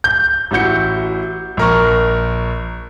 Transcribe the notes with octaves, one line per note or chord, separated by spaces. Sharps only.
G6
A1 E4 F#4 G6 C#7
A#1 A#4 C#6